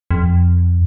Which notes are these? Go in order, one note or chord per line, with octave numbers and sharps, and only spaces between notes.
F2